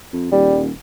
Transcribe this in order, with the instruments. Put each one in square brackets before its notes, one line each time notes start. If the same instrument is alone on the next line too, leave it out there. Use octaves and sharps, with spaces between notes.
[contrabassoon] F2
[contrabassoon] D#1 [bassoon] G3